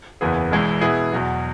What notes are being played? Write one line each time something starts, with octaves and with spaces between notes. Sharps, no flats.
F#1 E2 E3 B3 G#4
E1 E2 E3 G#3
B2 B3 E4 G#4
E2 B2 F#3